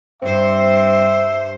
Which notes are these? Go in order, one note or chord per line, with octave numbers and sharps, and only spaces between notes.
G2 C4 C5 E5